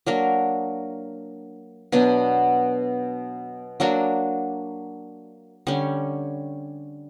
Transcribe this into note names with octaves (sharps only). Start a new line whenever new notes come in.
F#3 A#3 D4 A#4
B2 F#3 B3 D4
F#3 A#3 D4 F#4
D3 G3 C#4